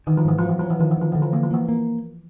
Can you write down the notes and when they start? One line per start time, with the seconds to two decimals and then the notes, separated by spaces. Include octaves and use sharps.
0.07 D#3 E3
0.17 F3
0.25 G#2 E3
0.38 F3 F#3
0.49 E3
0.59 F3 F#3
0.70 E3
0.79 D#3 F3
0.91 E3
0.97 D#3 F3
1.12 D3 E3
1.22 F3
1.33 E3 A#3
1.43 F3
1.51 E3 A#3
1.69 A#3